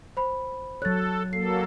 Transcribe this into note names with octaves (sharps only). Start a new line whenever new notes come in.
C5 B5
F#3 A4 C#5 F#6 A6
F#3 A#3 A4 C7